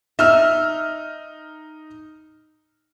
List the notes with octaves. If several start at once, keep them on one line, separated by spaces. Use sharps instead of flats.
D#4 E5 F6